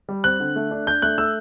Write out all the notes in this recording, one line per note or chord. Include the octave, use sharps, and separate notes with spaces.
G3
C4 F#6
D3
A3
D4
D4 G6
A3 F#6
A3 E6